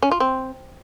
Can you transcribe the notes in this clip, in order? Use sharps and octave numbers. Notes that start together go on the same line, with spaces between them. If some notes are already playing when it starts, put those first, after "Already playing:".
C#4
F4
C4